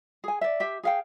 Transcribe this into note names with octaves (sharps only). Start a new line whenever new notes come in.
G#4 G#5
D5 E5
G4 E5
G#4 F5 G5